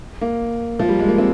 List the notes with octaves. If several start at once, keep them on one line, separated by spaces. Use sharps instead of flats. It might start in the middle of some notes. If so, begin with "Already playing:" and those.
A#3
F3
G3
G#3
A#3
C4